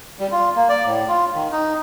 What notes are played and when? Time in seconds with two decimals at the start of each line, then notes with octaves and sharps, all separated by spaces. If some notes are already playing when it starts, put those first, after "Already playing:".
0.20 G3
0.32 F4
0.56 A#3
0.69 D5
0.85 A2
1.08 F4
1.35 D#3
1.52 D#4